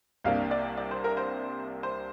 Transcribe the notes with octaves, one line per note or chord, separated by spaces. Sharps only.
C2 C3 A#3 D4 F5
D5
D5
C5
A#4
C5
C5